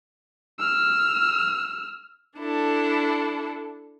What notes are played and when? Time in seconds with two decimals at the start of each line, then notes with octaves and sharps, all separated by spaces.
0.59 E6 F6
2.37 D4 E4 A4